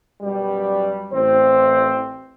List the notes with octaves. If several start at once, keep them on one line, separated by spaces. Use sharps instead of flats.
F#2 B2 G3
A1 C4 C5